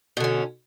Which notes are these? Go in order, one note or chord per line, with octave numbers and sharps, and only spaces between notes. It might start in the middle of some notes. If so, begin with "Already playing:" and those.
B2 D3 C#4